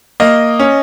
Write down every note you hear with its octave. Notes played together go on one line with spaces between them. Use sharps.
A#3 D#5
C#4